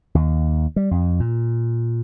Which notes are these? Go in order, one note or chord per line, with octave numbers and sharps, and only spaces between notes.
D#2
G3
F2
A#2